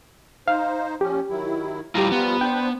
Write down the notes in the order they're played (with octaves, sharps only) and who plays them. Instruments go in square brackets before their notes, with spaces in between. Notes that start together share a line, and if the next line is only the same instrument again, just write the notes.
[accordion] D#4 C5 [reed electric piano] F5
[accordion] A#2 F3 C#4 [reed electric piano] G4
[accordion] D#3 F#3 E4
[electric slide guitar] G3 E4 F4 [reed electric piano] G4 A#5
[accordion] F3 G3 F4 [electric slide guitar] B3
[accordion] D4 C5 [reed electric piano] G5